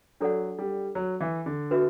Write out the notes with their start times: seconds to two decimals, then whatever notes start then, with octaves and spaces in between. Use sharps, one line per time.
0.21 F#3 D4 A4 D5 F#5
0.59 G3
0.95 F#3
1.21 E3
1.46 D3
1.71 D4 F#4 B4 E5